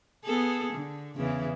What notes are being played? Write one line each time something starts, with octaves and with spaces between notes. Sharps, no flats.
B3 G#4 A4
D3
E2 C#3 E3